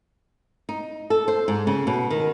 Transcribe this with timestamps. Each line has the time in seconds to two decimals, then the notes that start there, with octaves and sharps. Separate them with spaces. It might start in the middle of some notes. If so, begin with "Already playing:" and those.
0.69 D#4
1.10 A4
1.28 C5
1.48 G#2
1.67 C#3
1.87 B2
2.11 D#3